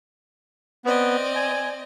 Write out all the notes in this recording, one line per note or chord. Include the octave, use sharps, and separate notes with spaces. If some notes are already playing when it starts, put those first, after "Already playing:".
B3 C4 D5 D#5
G#5